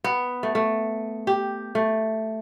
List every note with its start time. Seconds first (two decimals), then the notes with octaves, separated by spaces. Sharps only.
0.04 B3
0.43 A3
0.55 A3
1.27 G4
1.75 A3